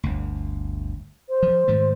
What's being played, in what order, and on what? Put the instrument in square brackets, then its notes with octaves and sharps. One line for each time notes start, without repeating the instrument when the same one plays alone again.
[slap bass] G1 D2
[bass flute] C5
[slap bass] F3
G#2 D#3 A3